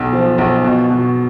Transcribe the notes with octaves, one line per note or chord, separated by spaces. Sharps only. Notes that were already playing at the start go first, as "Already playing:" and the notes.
Already playing: B1
F3
B1
B2
B2